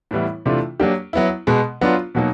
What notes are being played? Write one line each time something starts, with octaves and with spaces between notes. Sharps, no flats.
A2 E3 G3 B3 E4
C3 E3 A3 D4 F4
F#3 A#3 D4 G4
F#3 B3 E4
B2 G#3 B3
F#3 B3 D4 F4
B2 F#3 A#3 D#4